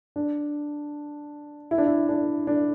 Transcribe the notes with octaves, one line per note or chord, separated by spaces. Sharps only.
D4
E4
D4
E4
D4
D4